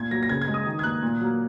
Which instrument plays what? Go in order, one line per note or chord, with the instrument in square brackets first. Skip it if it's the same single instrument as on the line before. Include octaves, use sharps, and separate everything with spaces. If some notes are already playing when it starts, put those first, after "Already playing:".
Already playing: [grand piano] A#2 G#6
F#3 A#3 A#6
A#6
C#3 G#6
G#6
G#3
D#6
D#3
G#6
A#3 F#6
A#2
F#3 A#3